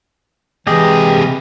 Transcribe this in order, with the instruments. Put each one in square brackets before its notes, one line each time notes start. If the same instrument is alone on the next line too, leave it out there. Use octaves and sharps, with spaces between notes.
[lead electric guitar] C3 D#5 [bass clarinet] E3 [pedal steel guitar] G#3 G4 G#4